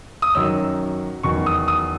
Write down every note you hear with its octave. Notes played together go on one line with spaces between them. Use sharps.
D#6
F#2 D#3 F#3 E6
E2 D#3 F#3 C#6
D#6
D#6